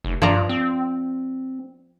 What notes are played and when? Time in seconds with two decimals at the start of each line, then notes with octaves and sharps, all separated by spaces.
0.04 F1
0.22 G2 F3 D5 A#5
0.49 C4